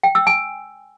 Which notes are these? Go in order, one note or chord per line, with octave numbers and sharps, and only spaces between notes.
G5
E6
G#5